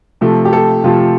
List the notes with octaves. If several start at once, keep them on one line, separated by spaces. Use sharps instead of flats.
C3 F3 A3
G4
A4
C3 F3 A3 F4